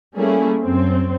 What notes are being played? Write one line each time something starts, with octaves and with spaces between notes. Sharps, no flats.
G3 A3 A#3 C#4 E4 G#4
F#2 C4